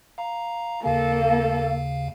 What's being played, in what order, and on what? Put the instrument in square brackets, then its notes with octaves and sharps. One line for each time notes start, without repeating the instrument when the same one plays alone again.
[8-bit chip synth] F5 A#5
[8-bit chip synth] D#2 C#3 F5 [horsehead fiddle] A#3 A4